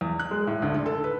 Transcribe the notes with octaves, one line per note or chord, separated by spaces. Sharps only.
E2
F#6
G#3
A2
D2
D3
A4
B4